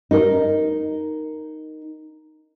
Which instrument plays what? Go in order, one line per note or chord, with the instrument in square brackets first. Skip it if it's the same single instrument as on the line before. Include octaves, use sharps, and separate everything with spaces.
[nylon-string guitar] D#4 A#4